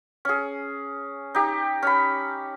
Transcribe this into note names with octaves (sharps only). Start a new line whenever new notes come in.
C#4 G#4
D#4 G4
C#4 B5